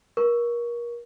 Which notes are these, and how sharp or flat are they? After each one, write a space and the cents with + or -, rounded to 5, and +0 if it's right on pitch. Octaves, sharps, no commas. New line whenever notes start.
A#4 +30 C#6 +10